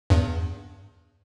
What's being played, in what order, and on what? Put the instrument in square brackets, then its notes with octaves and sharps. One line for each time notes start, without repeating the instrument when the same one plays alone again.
[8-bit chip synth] E2 G2